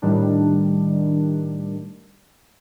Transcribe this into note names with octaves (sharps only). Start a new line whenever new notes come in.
A2 D#3 G3 D4